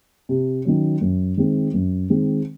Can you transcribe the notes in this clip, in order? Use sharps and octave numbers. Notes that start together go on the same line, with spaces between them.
C3
D#3 F#3 C#4
F#2
D#3 G#3 C4
F#2
D#3 G#3 C4